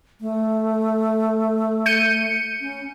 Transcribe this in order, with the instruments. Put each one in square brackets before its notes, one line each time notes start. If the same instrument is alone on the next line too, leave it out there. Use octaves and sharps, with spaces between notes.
[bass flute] A3
[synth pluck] G6 C#7 D#7
[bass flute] C#4